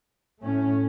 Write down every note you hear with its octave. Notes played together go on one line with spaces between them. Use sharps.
A2 A3 C#4